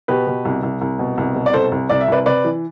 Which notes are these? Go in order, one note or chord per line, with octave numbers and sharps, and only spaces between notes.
B2 G4 B4
B2
C2
C2
C2
B2
C2
B2
D5
C2 A4 C5
C2
C2 D5
E5
C2 B4 D5
C3 B4 D5
E3